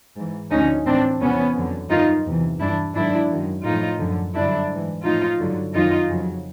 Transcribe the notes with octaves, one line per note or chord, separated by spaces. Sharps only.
G#2 E3
D2 D3 F3 C#4 D#4
A2 E3 C4 D4
E2 C3 E3 B3 C#4
F2 D3 F#3
G2 D#3 F#3 D#4 F4
E2 C3 E3
G2 E3 D4 E4
G#2 D#3 F#3 D4 E4
F#2 D#3 F#3
A2 F3 D#4 F4
F#2 D3 F3
G2 D3 F#3 D4 E4
G#2 E3
A2 F3 D#4 F4
G2 D3 F#3
F#2 D#3 F#3 D#4 F4
F2 C#3 F#3